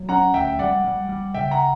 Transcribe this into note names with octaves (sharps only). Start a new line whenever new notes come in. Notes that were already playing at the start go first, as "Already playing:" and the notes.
Already playing: F#3
C#4 F#5 A#5
D2 E5 G5
G3 D5 F#5
G3
G3
C#3 E5 G5
F#5 A#5